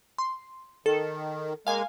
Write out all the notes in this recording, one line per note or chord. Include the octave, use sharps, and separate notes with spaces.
C6
D#3 A4
G#3 A#3 F5 G#5